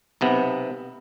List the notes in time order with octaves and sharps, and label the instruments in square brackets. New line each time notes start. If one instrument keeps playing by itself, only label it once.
[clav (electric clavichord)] B1 C3 B3